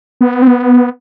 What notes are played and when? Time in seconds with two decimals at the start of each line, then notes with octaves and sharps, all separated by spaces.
0.21 B3
0.42 C4
0.47 B3